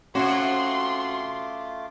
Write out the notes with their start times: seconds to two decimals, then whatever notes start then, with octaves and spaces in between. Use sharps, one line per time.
0.15 C3 A3 C#4 F4 F#4 C6 D6